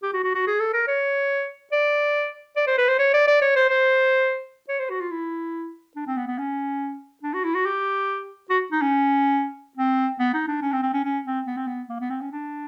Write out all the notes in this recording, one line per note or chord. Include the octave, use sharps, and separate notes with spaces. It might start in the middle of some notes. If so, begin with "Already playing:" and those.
G4
F#4
F#4
F#4
G#4
A4
A#4
C#5
D5
D5
C5
B4
C5
C#5
D5
D5
C#5
C5
C5
C#5
C5
F#4
F4
E4
D4
C4
B3
B3
C#4
D4
F#4
E4
F#4
G4
F#4
D#4
C#4
C4
B3
D#4
D4
C#4
C4
C4
C#4
C#4
C4
B3
C4
B3
A#3
B3
C4
C#4
D4